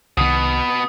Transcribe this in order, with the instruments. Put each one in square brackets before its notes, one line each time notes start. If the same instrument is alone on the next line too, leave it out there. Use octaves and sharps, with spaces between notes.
[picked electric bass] C2 D#3 [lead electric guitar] B2 B3 [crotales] D#6